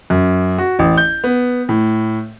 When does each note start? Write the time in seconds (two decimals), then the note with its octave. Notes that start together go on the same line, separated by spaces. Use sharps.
0.10 F#2
0.58 F#4
0.79 A1
0.98 G6
1.24 B3
1.69 A2